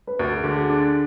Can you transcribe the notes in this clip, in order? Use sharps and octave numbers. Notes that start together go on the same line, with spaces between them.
B4
D2 A#4
G#4
D3 F#4
G#4
D4